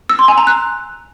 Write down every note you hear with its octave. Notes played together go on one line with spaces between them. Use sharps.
E6
C6
G#5
A#5
F#6